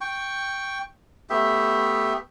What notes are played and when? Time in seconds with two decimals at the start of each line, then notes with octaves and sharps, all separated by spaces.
0.01 G5 C#6
1.30 A3 B3 G4 E5